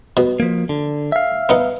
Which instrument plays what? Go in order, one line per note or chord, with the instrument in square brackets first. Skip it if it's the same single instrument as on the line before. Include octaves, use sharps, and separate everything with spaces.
[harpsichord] B2
[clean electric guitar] F3 A#3
D3
E5 F5
[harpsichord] B3 D#4 F#5